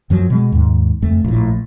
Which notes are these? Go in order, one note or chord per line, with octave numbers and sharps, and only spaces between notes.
F#2 F3 F#3
B2 G#3
D#2 G#2
F#1 F2 A3
A#1 A2